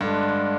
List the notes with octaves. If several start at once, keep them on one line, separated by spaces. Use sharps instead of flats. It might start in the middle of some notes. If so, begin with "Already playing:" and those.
G2 D3 G#3 D4